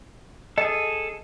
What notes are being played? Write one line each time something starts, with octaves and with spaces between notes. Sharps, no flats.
G#4 A4 D#5